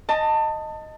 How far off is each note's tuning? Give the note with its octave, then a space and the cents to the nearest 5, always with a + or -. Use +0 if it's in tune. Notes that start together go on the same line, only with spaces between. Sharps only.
D#5 +0 A5 +25